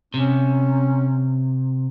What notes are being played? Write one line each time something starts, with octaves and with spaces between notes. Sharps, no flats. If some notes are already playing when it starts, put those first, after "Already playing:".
C3 C#4